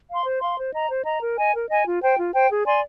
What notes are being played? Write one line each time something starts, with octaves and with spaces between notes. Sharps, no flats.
F5 C6
C5
F5 C6
C5
D#5 A#5
C5
D#5 A#5
A#4
D#5 G#5
A#4
D#5 G#5
F4
C5 G5
F4
C5 G5
G#4
D5 G#5 C6